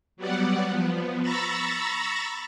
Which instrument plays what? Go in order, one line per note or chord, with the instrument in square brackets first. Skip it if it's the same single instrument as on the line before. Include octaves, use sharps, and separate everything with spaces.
[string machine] F#3 G3 B3 D5 F#5
F3 B3
A#5 B5 C#6 E6 A6 A#6